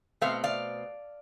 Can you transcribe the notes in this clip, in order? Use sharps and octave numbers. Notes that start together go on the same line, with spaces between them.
B2 A3 C4 F5
D5 F5